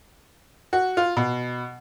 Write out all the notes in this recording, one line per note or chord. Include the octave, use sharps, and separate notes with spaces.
F#4
F4
B2